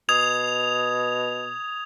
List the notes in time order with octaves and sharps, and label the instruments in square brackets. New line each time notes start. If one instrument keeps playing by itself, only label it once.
[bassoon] B2 [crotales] D#6 G#6 F7